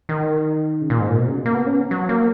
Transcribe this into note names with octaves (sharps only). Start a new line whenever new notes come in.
D#3
C#3
A#2
G#2
A#2
B2
C#3
A#3
B3
C#4
F#3
A#3